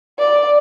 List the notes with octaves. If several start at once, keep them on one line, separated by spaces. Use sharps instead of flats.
D5